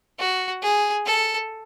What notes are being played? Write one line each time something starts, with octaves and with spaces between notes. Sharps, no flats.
F#4
G#4
A4